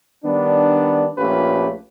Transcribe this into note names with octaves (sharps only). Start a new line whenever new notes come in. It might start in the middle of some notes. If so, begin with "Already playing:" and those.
D#3 G3 B3 D4
A#1 A3 C#4 F4 G4 B4